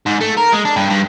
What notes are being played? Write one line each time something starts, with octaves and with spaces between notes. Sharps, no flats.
G#2
A3
A#4
G#3
D4
G2
G2